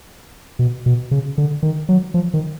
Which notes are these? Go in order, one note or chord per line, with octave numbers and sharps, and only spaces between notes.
B2
B2
C#3
D3
D#3
F#3
F3
D#3